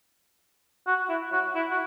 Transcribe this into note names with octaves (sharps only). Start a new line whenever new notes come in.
F#4
E4
F#4
E4
F#4